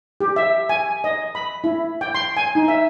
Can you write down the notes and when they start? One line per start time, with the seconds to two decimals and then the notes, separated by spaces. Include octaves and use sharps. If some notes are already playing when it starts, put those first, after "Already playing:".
0.21 G4
0.36 E5
0.69 G#5
1.04 D#5
1.35 B5
1.64 E4
2.01 G5
2.15 C6
2.37 G#5
2.55 D#4
2.68 E5